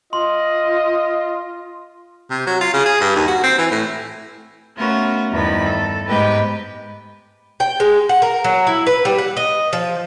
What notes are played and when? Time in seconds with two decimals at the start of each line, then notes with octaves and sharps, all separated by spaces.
0.13 F4 D#5 C6
2.30 C3
2.47 F#3
2.61 F4
2.74 C#3
2.86 G#4
3.01 G2
3.16 D#2
3.27 F#4
3.44 C4
3.58 E3
3.71 A2
4.76 A3 B3 C#4 F4 F#4 A#4
5.31 E2 G2 D#3 F3 B3 B5
5.66 A4
6.07 G#2 G#3 B3 G4 B4 G5
7.60 G5
7.80 G#3
8.09 F#5
8.22 A#4
8.44 F#3
8.67 E4
8.87 B4
9.05 G3
9.18 F#5
9.37 D#5
9.73 F3